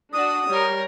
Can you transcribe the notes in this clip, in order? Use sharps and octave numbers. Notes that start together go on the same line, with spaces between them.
D4 F#4 D#6
G3 A#4 C#5